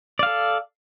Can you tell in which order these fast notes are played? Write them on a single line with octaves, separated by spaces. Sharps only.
D5 F5 A4